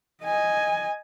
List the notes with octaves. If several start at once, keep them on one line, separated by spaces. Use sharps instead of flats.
D#5 G#5